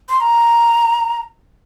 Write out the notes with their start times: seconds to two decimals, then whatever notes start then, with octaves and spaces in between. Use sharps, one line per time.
0.09 C6
0.20 A#5